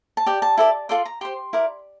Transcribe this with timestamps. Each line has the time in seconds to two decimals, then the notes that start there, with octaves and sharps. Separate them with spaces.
0.17 A5
0.26 G4 D5 G5
0.42 A5
0.57 E4 A4 D5
0.89 F4 A4 D5 C6
1.05 A#5
1.21 G4 C5 C6
1.53 E4 A#4 D5